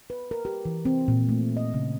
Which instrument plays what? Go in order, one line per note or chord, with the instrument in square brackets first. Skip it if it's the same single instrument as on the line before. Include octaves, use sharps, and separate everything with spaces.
[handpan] B4
A#4
G4
E3
C4
A#2
A3
D#5
C#3